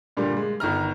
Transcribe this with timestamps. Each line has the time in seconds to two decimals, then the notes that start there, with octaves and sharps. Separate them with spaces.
0.17 G2 A#2 D3 G3
0.37 G#3
0.60 G1 D#3 A#5 F6